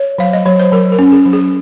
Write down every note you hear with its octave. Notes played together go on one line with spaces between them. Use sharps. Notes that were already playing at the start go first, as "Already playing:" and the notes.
Already playing: C#5
F#3 F5
D#5
F#3 C#5
C5
F#3 A#4
A#4
C#4
G#4
F#3
G#4